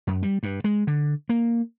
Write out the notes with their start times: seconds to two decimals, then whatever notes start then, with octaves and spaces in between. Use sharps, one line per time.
0.07 F#2
0.23 G3
0.43 G2
0.64 G#3
0.87 D3
1.29 A#3